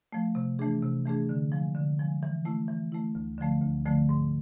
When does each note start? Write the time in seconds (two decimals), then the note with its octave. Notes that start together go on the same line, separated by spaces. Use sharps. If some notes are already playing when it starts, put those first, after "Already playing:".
0.13 F3 A3
0.35 C3
0.59 E3 A3 D4 G#4
0.82 C3
1.06 E3 A3 D4 G#4
1.29 D3
1.52 F3 G#3
1.75 D3
1.99 F3 G#3
2.23 E3
2.45 A3 E4
2.68 E3
2.92 A3 E4
3.15 D2
3.38 D3 F3 A3
3.61 D2
3.86 D3 F3 A3
4.09 G#2